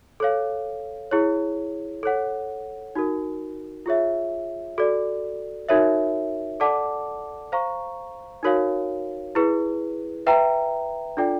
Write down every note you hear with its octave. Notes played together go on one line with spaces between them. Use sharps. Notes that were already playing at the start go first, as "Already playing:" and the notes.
A4 C#5 F5
E4 G#4 C#5
A4 C#5 F#5
D#4 F#4 A#4
F4 G#4 C#5 E5
F#4 A4 D5
D#4 F#4 A#4 C#5 E5
A4 D5 F#5 A5 D6
C5 F5 A#5 C#6
D#4 F#4 A#4 C#5 F5
E4 G#4 B4
B4 E5 G5 A#5
D4 F4 A4 D5 G5